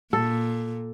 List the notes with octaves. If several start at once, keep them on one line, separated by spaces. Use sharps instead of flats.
A#2 A4